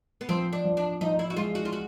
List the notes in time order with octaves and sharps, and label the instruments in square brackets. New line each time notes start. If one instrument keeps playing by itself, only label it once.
[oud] B3
[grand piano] F3 [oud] C4
[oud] D4
[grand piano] F3
[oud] D4
[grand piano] F3 [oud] D#4
[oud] E4
F#4
[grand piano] G#3 [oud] F4
[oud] F#4
F4
F#4